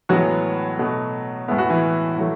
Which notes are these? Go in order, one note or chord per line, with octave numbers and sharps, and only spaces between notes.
A2 E3 F#3 G#3 B3 F#4
B2 A3
A2 G#3 B3 E4
F#4
E3 E4
A2 F#3 A3